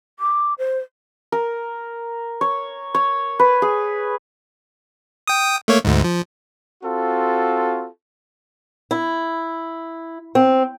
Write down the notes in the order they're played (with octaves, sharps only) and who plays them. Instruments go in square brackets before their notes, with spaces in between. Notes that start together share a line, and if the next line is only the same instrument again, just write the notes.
[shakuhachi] D6
C5
[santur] A#4
C#5
C#5
B4
G#4
[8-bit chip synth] G5 D#6
A3 A#3 C#5
D2 G#2
F3
[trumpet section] C4 F4 F#4 A4
[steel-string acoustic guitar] E4
C4